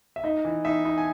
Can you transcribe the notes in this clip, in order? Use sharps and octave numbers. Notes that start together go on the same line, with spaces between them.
E5
D#4 D#5
E3
D#4 E5
D#4
G#5